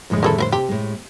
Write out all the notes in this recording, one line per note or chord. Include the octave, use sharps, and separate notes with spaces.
A#1 F2 A2 D3 G#3
G2 D#3 C4 E4 G#4 A4
A3 A#4 C5
C3 G4
A2 G#3